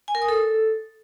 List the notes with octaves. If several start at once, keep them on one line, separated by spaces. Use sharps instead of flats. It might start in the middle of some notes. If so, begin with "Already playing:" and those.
G#5
A#4
D#6
A4